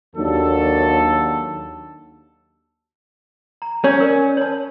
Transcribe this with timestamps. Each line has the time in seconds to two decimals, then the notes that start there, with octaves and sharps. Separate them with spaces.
0.16 D#2 F#3 D4 A4
3.62 A#5
3.84 C#4 C#5
4.00 A#4 D5
4.37 C#5 A5